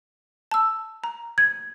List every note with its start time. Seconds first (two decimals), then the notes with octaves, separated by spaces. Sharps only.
0.51 A5 E6
1.04 A#5
1.38 G#6